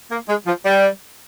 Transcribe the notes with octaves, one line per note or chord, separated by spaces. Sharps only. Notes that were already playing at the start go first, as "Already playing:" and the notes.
A#3
G#3
F3
G3